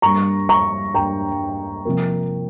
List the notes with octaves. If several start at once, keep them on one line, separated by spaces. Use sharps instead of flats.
G2 G3 A#3 A#5 C#6
A#5 C#6
G2 G3 A#3 G5 A#5
C3 F3 A#3